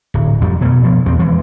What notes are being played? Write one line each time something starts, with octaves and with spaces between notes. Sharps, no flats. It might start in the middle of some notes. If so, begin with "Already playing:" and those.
D1
F2 F3 G3
B2 A3
B2 F3
E2 C4
E3 F3 G#3